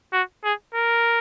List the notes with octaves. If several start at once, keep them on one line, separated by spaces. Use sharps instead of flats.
F#4
G#4
A#4